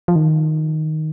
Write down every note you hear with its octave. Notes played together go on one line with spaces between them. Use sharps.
F3
D#3